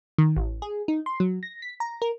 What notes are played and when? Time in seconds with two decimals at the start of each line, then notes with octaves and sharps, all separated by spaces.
0.18 D#3
0.36 A1
0.62 G#4
0.88 D#4
1.06 C6
1.20 F#3
1.43 A#6
1.62 B6
1.80 A#5
2.02 A#4